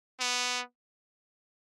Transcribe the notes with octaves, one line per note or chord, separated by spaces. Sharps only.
B3